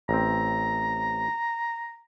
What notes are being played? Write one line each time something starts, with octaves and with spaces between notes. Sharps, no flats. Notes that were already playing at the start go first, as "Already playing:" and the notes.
A1 C4 A#5